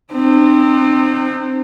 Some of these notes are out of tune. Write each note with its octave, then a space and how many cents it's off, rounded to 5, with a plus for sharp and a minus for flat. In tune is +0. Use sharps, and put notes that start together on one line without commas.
C4 +0 D#4 -45